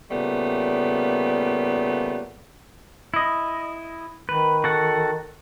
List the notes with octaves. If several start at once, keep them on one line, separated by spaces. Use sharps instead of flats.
A#2 C#3 G3 A3 B3
E4 D#5
D#3 B4
F#4 A4 F#5